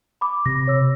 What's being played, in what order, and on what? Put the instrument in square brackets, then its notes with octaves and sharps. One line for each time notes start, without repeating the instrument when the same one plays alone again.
[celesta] B5 D6
[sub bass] C3 [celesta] A#6
[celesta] C#5 E6